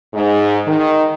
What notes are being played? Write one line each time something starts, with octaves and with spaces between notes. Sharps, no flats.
G#2
D#3